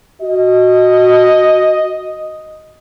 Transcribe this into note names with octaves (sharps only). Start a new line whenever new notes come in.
F#4 D#5